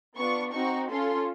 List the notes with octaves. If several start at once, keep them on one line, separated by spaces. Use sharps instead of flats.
B3 D4 F4 C#6
C4 D#4 F#4 C#6
C#4 F4 A4 C6